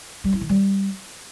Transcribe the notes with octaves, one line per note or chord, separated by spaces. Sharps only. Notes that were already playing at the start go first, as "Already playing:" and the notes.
G3
E4
D#3
G3